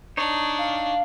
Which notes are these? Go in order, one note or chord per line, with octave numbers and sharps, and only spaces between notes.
D4 D#4 C#5
F5